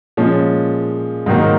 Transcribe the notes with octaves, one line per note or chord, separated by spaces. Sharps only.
A#2 F3 G#3 C#4
G#2 D#3 F#3 A#3